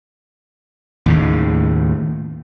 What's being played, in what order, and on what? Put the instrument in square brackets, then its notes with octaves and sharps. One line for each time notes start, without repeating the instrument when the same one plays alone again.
[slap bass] D#2 A2 C#3